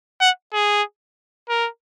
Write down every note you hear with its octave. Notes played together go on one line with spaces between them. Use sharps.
F#5
G#4
A#4